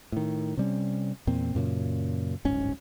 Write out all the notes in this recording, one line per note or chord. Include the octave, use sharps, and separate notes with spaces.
A2 D#3
C3 G3 C#4
E2 A#2 C4
F#2 A#2 C#3
D1 G1 G#2 C#4